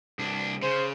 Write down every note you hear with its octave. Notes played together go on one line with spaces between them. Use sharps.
C2 D4
C#3 C5